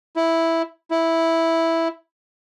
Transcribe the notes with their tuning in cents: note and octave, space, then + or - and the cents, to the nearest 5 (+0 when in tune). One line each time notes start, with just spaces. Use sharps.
E4 -5
E4 -5